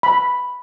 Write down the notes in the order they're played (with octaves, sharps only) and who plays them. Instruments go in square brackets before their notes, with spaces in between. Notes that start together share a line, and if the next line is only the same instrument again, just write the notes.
[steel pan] B5